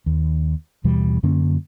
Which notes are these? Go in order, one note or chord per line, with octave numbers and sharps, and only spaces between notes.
D#2
D#2 B2 E3 G3
F#2 D3 A#3 C#4